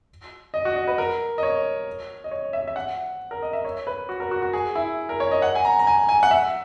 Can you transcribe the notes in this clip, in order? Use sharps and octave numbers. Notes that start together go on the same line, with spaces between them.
D#5
F#4
D#5
B4
A#4
D#5
C#5
D#5
C#5
E5
E5
F#5
A#4
D#5
E5
C#5
B4
F#4
A#4
F#4
F#4
G#4
E4
A#4
C#5
D#5
F#5
G#5
A#5
A#5
G#5
G#5
F#5
E5